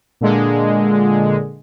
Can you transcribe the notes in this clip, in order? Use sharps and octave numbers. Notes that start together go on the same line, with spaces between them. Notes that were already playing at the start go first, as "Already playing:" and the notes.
A#2 D3 G#3